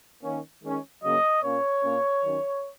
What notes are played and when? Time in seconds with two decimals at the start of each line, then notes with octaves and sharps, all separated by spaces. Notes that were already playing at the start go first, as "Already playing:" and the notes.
0.22 D#3 A#3 C#4
0.62 D#3 G#3 C#4
1.02 C#3 F#3 A#3 C#4 D#5
1.42 A#2 A#3 C#4 C#5
1.83 A#2 A#3 C#4
2.23 D#3 F#3 C#4